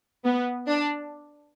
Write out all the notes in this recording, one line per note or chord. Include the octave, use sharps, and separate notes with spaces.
B3
D4